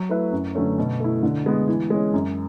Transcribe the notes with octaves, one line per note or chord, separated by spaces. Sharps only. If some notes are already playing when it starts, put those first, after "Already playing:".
Already playing: F#3
A3 E4 B4 E5
F#2
D3 F#3 A3 C#4
B2
A3 E4
D3
G#3 B3
E3
G#3 C#4
F#2